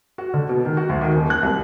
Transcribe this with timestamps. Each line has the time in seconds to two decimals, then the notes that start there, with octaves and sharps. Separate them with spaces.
0.18 F#4
0.34 D3
0.49 B2
0.65 D#3
0.77 F#4
0.90 D2
1.01 D#3
1.15 D#1
1.30 F#6
1.43 C2